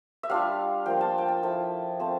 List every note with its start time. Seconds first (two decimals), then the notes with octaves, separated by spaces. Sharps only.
0.23 E5
0.29 G3 D4 F4 F5
0.86 F3 A#3 F4 G5
1.01 A5
1.18 G5
1.28 A5
1.43 F3 A3 E4 A5
1.99 A3 C4 F4 A5